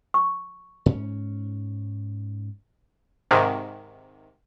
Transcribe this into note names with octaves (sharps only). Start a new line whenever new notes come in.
C#6
G#2 C#4
G#2 C3 D#3